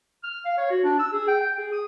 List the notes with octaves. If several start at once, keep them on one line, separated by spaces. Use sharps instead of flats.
F6
F5
C#5
F#4
D4
E6
G#4
G5
G5
G#4
D#6